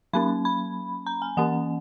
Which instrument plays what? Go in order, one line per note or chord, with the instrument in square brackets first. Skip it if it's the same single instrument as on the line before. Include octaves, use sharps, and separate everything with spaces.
[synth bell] F#3 A#3 C#4 B5
B5
A#5
G#5
E3 A#3 C#4 F#5